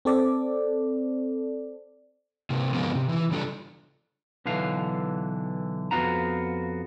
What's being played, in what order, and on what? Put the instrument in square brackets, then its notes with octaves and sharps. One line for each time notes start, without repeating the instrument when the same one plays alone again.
[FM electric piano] C4 A4 D5
[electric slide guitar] C3 A#3
D3 F3 G#3 A#3 B3
C3
E3 E4
C#3 G3 D4 F4 A4
[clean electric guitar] B1 D3 E3 F5
F2 B3 F4 F#4 A#5